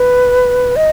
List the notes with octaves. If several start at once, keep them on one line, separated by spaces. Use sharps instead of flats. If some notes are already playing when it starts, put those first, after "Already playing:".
Already playing: B4
D#5